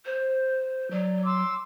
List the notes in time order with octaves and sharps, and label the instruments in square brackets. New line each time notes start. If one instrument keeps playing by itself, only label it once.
[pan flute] C5
[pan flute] F#3 [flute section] D5
[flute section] C6 D6 E6